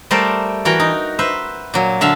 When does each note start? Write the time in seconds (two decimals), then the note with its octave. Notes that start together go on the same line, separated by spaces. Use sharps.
0.11 G3 A3 A#4 C5 D5
0.65 E3 F#4 A#4 G5
0.80 D#4
1.19 B4 C5 E5
1.74 A#2 F#3
2.01 D3 E5 F5 A5